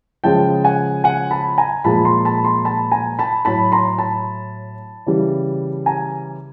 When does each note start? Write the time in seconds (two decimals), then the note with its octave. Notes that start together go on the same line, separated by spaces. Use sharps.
0.24 C#3 F3 G#3 G5 A5
0.64 F#5 G#5
1.04 F#5 G#5
1.31 A5 B5
1.58 G#5 A#5
1.84 A#2 F3 G#3 A5 B5
2.05 A#5 C6
2.25 A5 B5
2.45 A#5 C6
2.65 A5 B5
2.92 G#5 A#5
3.19 A5 B5
3.45 A2 F#3 A5 B5
3.72 A#5 C6
3.98 A5 B5
5.06 C#3 E3 G3
5.86 G#5 A#5